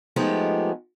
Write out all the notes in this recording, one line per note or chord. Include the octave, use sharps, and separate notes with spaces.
F3 G#3 A3 B3 D#4 G4